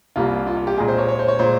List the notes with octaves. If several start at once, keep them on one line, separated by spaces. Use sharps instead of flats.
C2 C3 G3 A#3 F4
F4
F4
G4
A#2 G#3 G#4
C5
C#5
C#5
C5
C#5
A#2 G#3 C5